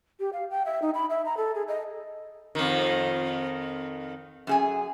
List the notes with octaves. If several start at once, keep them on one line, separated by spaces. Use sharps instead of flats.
G4
F5
G5
E5
D#4
B5
E5
A#5
A4
G#4
D#5
F2 D#3
F#2 G#4 G#5